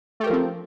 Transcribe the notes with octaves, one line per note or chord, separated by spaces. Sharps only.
F3 A3 C4 G4 A#4